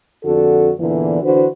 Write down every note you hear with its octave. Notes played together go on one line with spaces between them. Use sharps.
F2 D3 F#4 A4
E2 A#2 D3 E3
D3 E3 F#4 B4 C5